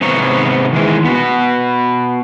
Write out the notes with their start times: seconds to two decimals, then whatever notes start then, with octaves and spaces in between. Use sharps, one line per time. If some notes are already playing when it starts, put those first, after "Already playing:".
0.01 G#2 C3 B3 C#5 A#5
0.73 D#3 E3 G#3
1.05 B3 F#4